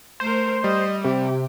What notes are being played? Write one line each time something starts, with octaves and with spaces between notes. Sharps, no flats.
A3 A#4 C5
G3 D#5
C3 G4